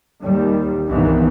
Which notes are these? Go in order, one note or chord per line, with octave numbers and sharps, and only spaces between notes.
D#2 D#3 G3
C2 G2 C3 D#3 E3 B3